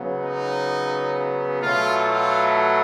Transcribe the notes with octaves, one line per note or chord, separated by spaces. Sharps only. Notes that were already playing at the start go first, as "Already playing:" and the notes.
Already playing: C#3 F#3 B3
D#4
B2 F#3 A3 F4
F4